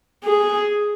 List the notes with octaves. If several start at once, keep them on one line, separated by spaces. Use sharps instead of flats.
G#4